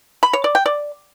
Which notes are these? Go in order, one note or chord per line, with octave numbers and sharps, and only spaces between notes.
B5
C#5
D5
G5
D5